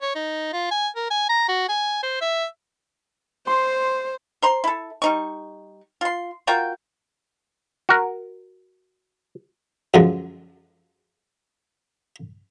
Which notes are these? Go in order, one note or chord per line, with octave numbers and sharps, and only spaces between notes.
C#5
D#4
F4
G#5
A#4
G#5
A#5
F#4
G#5
C5
E5
C5 C6
C5 A#5 C6
E4 A4
G3 D#4 C#6
F4 C6
F4 F#4 A#4 G5
F#4 A#4
F#2 D3 F3 G#3